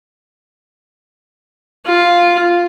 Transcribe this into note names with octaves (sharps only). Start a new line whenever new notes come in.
F4